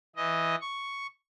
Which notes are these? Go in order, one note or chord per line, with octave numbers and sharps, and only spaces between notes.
E3 D#5
C#6